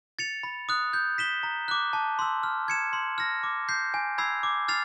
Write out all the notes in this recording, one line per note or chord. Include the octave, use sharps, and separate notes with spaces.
A6 C#7 F7
B5
D#6 F#6
G6
B6 E7 G7
A#5
D6 F#6
A5
C6 E6
F6
G#6 C#7 E7
C6
F6 A#6
D6
G6 C7
G#5
B5 E6 G#6 C7
D6
F6 A6 C7 F7